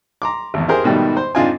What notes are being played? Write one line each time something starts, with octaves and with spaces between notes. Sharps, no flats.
A#5 C6 D6
G#1 E2
E4 G4 G#4 A#4 C5
G#2 B2 D#3 G3 A3
C5
G#2 C4 D4 F4 D#5 G#5